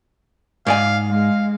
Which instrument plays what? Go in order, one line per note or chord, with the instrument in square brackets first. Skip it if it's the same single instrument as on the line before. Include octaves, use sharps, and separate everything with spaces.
[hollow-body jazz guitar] G#2 D5 G#5 [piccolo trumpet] F5
[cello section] G#3 [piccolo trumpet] F5